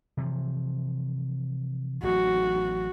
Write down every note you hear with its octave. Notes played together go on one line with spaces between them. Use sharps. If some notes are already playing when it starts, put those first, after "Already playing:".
C3 E3 F3
A1 F#3 F#4